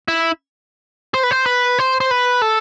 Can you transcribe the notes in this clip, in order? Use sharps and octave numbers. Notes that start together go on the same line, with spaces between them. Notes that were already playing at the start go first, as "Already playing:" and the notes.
E4
C5
B4
C5
B4
C5
C5
B4
A4